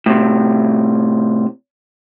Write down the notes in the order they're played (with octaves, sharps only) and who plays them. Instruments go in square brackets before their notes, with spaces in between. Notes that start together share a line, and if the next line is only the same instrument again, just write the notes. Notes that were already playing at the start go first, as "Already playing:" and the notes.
[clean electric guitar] A2 C3